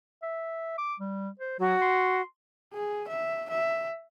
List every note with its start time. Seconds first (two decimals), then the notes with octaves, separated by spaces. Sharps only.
0.22 E5
0.78 D6
1.00 G3
1.39 C5
1.59 F#3 F#4
1.82 C6
2.73 G#4
3.08 E5
3.50 E5